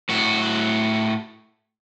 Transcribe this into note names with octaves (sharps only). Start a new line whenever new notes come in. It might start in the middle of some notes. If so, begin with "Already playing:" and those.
A2 F#4